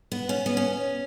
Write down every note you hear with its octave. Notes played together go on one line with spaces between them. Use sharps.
B3
C#4
B3
C#4